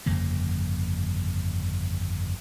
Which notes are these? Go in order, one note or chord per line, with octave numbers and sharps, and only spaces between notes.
G1 F2 C#3 A#3